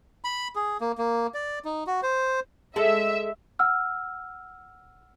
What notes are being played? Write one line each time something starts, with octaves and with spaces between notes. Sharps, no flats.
B5
G#4
A#3
A#3
D5
D#4
F#4
C5
G#3 A4 E5
F#5 E6 F6